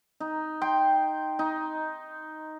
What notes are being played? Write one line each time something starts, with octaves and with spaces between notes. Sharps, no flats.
D#4
G5 C6
D#4